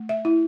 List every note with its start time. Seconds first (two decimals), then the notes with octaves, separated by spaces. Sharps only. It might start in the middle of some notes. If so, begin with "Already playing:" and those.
Already playing: A3
0.09 E5
0.25 E4